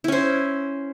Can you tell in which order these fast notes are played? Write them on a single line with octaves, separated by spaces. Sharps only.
E4 C#4 C5